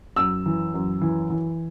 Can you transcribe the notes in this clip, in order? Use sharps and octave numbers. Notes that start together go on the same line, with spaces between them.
F#2 E6
E3
F#2
E3
E3